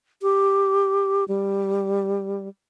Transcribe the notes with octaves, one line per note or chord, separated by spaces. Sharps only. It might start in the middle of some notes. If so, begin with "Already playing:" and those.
G4
G3